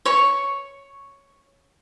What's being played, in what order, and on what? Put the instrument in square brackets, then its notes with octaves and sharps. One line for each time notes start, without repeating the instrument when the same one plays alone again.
[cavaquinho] C#5 C#6